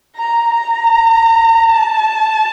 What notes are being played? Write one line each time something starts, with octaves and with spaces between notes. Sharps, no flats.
A#5
A#5
A5